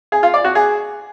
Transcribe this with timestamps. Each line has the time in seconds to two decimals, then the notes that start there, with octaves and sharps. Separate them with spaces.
0.12 G#4
0.23 F4
0.34 D5
0.44 F#4
0.55 G#4